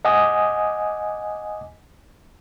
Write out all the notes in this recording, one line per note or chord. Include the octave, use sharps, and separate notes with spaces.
D#5 F#5 G#5 D6 D#6